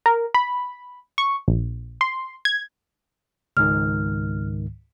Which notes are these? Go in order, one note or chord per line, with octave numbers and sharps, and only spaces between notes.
A#4
B5
C#6
A#1
C6
G#6
C#2 G#2 D#3 F6